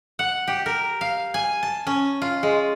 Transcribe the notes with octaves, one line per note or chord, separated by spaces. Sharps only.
F#5
G4
A#4
F5
G#5
A5
C#4
F4
G#3